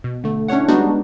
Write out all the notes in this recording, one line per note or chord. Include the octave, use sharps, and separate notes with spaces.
B2
D3 A3
C#4 D4 E4 C#5 F#5
G3 G#3 B3 D4 D#4 F#4